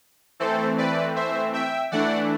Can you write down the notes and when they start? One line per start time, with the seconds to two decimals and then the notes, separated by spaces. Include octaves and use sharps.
0.40 E3 A3 C4 A4 C5
0.78 B4 D5
1.16 C5 E5
1.53 E5 G5
1.91 E3 A3 D4 D5 F#5